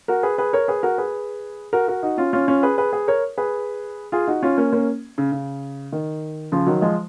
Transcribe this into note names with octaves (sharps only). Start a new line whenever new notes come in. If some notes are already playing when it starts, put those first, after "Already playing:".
F#4 A#4
G#4 B4
G#4 B4
A#4 C#5
G#4 B4
F#4 A#4
G#4 B4
F#4 A#4
F#4 A#4
D#4 F#4
C#4 F4
C#4 F4
C#4 F4
G#4 B4
G#4 B4
G#4 B4
A#4 C#5
G#4 B4
F4 G#4
D#4 F#4
C#4 F4
A#3 C#4
A#3 C#4
C#3
C#3
D#3
C#3 F3
D#3 F#3
F3 G#3